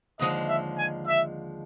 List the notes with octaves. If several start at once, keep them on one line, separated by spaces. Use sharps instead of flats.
D#2 D3 F3 G#3 D#5
E5
G#5
E5